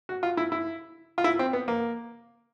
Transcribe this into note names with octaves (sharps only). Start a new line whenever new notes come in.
F#4
F4
E4
E4
F4
E4
C4
B3
A#3